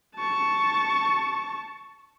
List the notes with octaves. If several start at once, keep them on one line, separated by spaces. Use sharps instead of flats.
A5 C#6